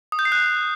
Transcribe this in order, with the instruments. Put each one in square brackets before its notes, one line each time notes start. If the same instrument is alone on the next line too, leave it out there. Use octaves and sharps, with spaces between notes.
[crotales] D#6
G6
C7
F#6